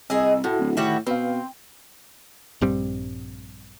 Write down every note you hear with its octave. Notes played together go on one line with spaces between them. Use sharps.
C2 G#4 D#5 G#5 E6
A2 E4 F#4 A4
D1
A2 D#3 G3 F#4 E5
B2 C4 B4 F5
A#1 G2 G3 C4